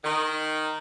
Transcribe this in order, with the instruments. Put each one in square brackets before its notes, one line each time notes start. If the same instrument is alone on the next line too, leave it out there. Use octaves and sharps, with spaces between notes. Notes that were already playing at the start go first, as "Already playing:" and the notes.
[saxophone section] D#3